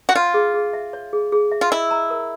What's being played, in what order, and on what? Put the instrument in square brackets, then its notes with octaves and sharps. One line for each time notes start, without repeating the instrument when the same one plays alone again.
[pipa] F#4
[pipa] F4 [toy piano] C#5
[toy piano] G#4
G#4
E5
C#5
G#4
G#4
E5
[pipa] F4
[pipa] E4 [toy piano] D#5
[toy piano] A#5
A#4